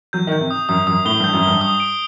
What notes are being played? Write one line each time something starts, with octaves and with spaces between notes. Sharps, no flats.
F#3 G6
D#3
G6
C3
D#6
F#2 D#6
F#2 D#6
A2 G7
G2 G6
F#2
G2 G7
D#6
D7